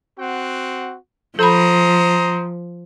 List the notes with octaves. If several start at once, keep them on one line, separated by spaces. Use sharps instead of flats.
C4 F#4 F#5
F3 A4 C5 A#5 B5 D#6